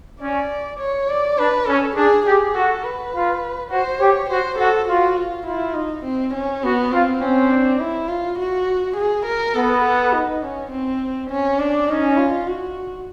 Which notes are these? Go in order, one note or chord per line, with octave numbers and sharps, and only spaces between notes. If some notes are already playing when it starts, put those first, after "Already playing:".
C#4 D5
C#5
D5
D4 B4
C#4 A4
D4 G#4
G4 G#4
F#4 A4
B4
F4
F#4 C5
G4 C#5
F#4 C5
F#4 A4
F4 F#4
F4
E4 F4
D#4
C4
C#4
B3 F#4
C4 F4
C4 C#4
D4
E4
F4
F#4
G#4
A#4
B3 A4
A4
D#4
C#4
C4
C#4
D4
C#4 D#4
F4
F#4